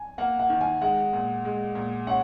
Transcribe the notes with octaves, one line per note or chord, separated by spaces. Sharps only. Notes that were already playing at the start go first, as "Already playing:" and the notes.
Already playing: G#5
A#3 F#5
F#5
D#3
G#5
G#3 F#5
A#2
G#3
A#2
C#4 F#5